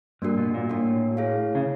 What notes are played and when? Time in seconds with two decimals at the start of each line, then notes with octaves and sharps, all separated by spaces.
0.22 G2 A#3 D4 F#4 A#4
0.38 B2
0.54 A#2
0.70 A2 A#3 D4 F#4 A#4
1.17 E4 G#4 C#5 F5
1.55 C#3